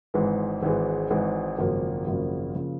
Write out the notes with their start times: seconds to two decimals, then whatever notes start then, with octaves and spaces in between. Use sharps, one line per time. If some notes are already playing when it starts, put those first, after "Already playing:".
0.14 G#1 G#2 E3 G#3
0.63 G#1 G#2 E3 G#3
1.11 G#1 G#2 E3 G#3
1.58 G#1 F#2 C#3 F3 A#3
2.07 G#1 F#2 C#3 F3 A#3
2.55 C#3 F3 A#3